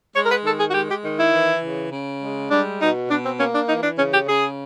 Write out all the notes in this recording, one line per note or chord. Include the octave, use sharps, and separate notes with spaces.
G#3 C#5
A#4
B4
D#3 A4
G#4
F#4
G#3 G4
G4
D#3
E4
E3
C#3
C#3
G#3
G3 D4
B2 D#4
B2 D4
C4
A#3 C#4
D4
E3 D#4
D4
C#3 C#4
G4
C#3 G#4